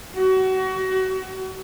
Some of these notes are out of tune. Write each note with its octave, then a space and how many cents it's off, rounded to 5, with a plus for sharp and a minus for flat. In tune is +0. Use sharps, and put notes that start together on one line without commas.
F#4 +30